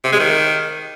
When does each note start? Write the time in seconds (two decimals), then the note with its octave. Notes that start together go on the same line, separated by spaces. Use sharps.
0.04 C3
0.12 G#3
0.20 D#3